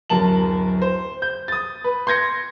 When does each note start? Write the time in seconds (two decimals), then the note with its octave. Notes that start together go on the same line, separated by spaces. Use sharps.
0.10 D1 F#2 A#4 A5 F#7
0.82 C5
1.22 G6
1.48 D#6 A6
1.84 B4
2.07 C6 G6 G#6 A#6 C#7